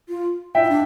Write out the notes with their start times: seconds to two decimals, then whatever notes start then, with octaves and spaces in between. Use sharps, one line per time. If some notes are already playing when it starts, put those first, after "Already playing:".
0.09 F4
0.55 F4 E5 G5
0.63 E4
0.70 D4